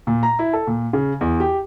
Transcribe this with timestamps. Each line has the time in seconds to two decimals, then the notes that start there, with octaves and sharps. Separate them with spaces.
0.07 A#2
0.23 A#5
0.39 E4
0.53 A4
0.67 A#2
0.93 C#3
1.21 E2
1.40 G4